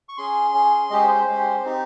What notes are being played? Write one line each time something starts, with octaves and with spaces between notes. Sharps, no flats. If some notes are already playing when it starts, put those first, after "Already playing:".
C#6
C#4 G#4 C6
C#4 G#4
G#3 C#4 G4 D#5
C5
C5
G#3 C#4 G4
C4 D#4 G4